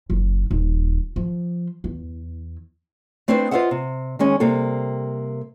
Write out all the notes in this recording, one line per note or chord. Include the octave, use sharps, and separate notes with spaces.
F#1
D#1
F3
E2
A3 C4 D4 E4 B4 C5
F4 B4 C5 D#5 E5 F#5
C3
D#3 G#3 C#4
C3 G3 A#3 A4